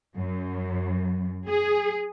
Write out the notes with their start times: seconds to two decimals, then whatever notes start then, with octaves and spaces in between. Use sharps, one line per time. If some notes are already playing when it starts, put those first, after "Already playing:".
0.18 F#2
1.48 G#4